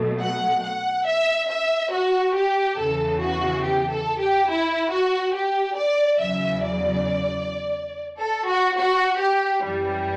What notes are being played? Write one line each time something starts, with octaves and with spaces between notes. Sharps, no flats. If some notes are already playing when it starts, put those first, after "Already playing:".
Already playing: B2 F#3 A3
F#5
F#5
E5
E5
F#4
G4
E2 C#3 E3 A4
F#4
G4
A4
G4
E4
F#4
G4
D5
E2 C#3 F#3 E5
D5
A4
F#4
F#4
G4
F#2 E3 G3